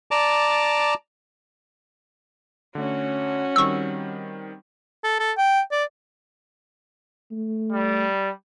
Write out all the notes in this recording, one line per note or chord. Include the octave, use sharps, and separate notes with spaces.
D5 A5 A#5 D6
D3 A3 C#4 F#4
D#3 G3 C4 C#6 E6
A4
A4
G5
D5
A3
G3